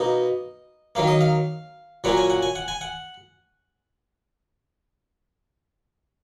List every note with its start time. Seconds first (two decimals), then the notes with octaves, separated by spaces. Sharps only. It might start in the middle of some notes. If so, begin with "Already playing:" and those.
Already playing: B2 A#3 D#4 D#5
0.95 D#3 F#3 A#3 F5
1.07 D#5
1.21 F5
2.04 A#2 F#3 A#3 C#4 F#5
2.17 G#5
2.30 F#5
2.42 G#5
2.55 F#5
2.68 G#5
2.81 F#5